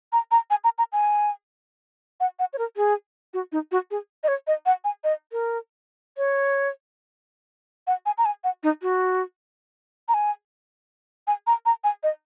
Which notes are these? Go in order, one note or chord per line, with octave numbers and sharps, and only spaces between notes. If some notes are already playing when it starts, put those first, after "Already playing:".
A#5
A#5
G#5
A#5
A#5
G#5
F#5
F#5
C#5
A#4
G#4
F#4
D#4
F#4
G#4
D#5
C#5
D#5
F#5
G#5
D#5
A#4
C#5
F#5
G#5
A#5
G#5
F#5
D#4
F#4
A#5
G#5
G#5
A#5
A#5
G#5
D#5